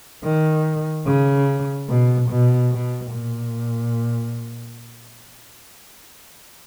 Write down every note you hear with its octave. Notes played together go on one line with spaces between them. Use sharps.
D#3
C#3
B2
B2
B2
A#2